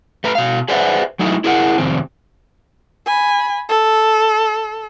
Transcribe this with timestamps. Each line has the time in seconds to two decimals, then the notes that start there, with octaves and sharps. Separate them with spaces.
0.24 A3 B4 A#5
0.35 B2 F5
0.68 G#4 B4 C5 D5 E5 F#5
1.19 F#3 A3 D#4 E4
1.44 E4 G#4 A#4 E5 F#5
1.78 F2 C3 D#3 C4
3.06 G#5 B5
3.69 A4